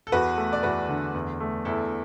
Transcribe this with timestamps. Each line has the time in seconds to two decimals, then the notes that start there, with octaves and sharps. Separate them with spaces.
0.07 A4
0.12 E2 F#4 B4
0.37 A3
0.53 D5
0.63 E2 F#4 B4
0.89 D3
1.14 E2
1.40 A3
1.65 E2 E4 A4